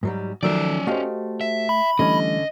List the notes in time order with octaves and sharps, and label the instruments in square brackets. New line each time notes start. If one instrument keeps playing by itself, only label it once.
[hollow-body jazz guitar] G#2 F#3 G3
[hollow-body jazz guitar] D#3 A3 [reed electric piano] F3 F#3 E6 [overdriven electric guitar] C#4 D5
[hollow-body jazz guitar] A3 D#5 F5 [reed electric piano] F#4 G4 C5
[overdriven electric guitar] E5
[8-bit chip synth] B5
[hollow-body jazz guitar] D3 C#4 [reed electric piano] E3 G3 A3 [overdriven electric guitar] D#5